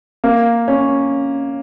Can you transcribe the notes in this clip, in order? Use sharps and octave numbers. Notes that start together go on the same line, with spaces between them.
A#3
C#4